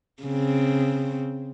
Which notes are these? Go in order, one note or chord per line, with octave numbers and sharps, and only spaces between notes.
C#3 C4